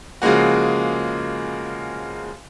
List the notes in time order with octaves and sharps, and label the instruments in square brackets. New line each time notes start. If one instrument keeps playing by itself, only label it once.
[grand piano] C#3 F3 G#3 A#3 F#4